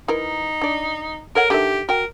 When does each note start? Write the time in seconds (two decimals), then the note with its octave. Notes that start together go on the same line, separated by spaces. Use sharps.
0.08 E3 D#4 A#4
0.61 D4 D5
1.35 A4 A#4 C#5 F#5
1.50 D3 D#3 G4 E5
1.89 F#4 A#4 G5